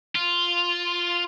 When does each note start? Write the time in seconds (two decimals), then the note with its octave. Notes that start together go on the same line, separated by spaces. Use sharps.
0.15 F4